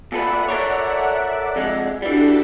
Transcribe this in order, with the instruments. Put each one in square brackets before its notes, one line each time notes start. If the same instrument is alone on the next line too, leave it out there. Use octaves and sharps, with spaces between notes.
[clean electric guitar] A#2 A4 B4 [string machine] D5 E5 F#5
[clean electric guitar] A4 A#4 C#5
F2 G#3
[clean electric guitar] E3 G3 [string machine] D4 F#4 A4